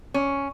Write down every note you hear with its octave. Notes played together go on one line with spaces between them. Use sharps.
C#4